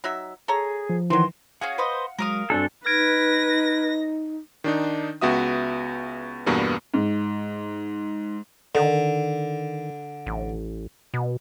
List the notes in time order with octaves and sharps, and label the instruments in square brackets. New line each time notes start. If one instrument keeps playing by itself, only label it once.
[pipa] F#3 D#4 E5
[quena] G#4 [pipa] A4 C#5 A#5
[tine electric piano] F3
[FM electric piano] D#3 E3 [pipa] F#3 C4 [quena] C6
[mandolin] C#4 F#4 G#4 [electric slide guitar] F5 F#5
[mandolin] B4 C5 D#5
[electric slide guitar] F#3 G#3 [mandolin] A#4 F5 D#6
[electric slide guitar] G2 F#4 G#5 [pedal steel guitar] C4 D4 A4
[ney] D#4 [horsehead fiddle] B4 [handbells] F6 G#6 D7 [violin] A#6
[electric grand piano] D#3 D4 D#4
C#2 B3 F#4 E5 D#6
E2 G2 B2 A#3 B3
[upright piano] G#2
[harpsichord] D3 [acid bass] D#3
[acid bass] A1
B2